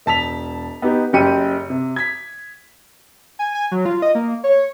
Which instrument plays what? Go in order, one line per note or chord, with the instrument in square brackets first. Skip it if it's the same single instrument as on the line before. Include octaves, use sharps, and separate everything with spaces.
[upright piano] E1 A5 B6 F7
B3 D#4 G4
F#1 F#2 G4 G5 C#7 D#7
C3
G#6 B6
[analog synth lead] G#5
G#5
F#3
F4
D#5
A#3
C#5